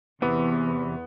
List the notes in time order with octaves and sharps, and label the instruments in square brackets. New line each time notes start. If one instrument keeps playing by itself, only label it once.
[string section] E2 [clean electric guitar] C3 E3 [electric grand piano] B3